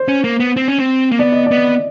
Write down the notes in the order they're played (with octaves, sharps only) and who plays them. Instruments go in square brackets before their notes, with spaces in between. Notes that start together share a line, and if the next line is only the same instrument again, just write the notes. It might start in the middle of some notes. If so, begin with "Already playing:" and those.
Already playing: [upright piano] C5
[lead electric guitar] C#4
A#3
B3
C4
C#4
C4
A#3
[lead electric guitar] B3 [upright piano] D5
[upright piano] D#5
[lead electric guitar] B3 [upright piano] D5